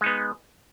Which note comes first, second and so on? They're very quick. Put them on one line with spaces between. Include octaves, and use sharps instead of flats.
G#3 D#4 B3